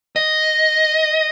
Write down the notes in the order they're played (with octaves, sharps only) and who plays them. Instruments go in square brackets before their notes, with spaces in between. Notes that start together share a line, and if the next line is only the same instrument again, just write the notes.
[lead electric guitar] D#5